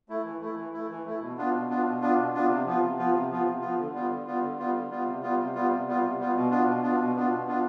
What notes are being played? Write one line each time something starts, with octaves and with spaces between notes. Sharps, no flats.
A3 E4
E3
A3 E4
E3
A3 E4
E3
A3 E4
B2
B3 D4 F4
B2
B3 D4 F4
B2
B3 D4 F4
B2
B3 D4 F4
C3
F3 B3 F4
C3
F3 B3 F4
C3
F3 B3 F4
C3
F3 B3 F4
D3
G3 B3 F4
D3
G3 B3 F4
D3
G3 B3 F4
D3
G3 B3 F4
C3
G3 B3 F4
C3
G3 B3 F4
C3
G3 B3 F4
C3
G3 B3 F4
B2
B3 D4 F4
B2
B3 D4 F4
B2
B3 D4 F4
B2
B3 D4 F4